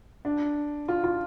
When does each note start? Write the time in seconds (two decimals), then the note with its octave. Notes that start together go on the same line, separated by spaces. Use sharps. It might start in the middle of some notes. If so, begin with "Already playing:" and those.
0.25 D4
0.88 F4
1.04 F4